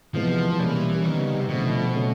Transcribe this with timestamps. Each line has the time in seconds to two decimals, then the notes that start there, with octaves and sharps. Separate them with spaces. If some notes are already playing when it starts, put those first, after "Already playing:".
0.14 C3 E3 F3 G#3 B3
0.59 B2 E3 G3 A#3 C#4
1.04 D#3 G3 B3 D#4
1.19 C#3
1.34 C3
1.49 B2 D3 F3 A3 C4
1.94 C#3 F#3 A3 C#4